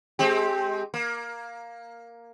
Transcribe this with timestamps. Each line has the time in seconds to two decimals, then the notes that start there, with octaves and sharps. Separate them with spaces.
0.19 G#3 C4 G4
0.94 A#3